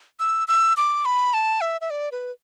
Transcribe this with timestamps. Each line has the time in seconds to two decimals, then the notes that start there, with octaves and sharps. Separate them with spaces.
0.19 E6
0.48 E6
0.77 D6
1.05 B5
1.34 A5
1.61 E5
1.81 E5
1.90 D5
2.12 B4